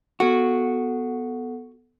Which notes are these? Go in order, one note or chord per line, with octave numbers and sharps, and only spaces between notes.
B3 F#4 A4 F#5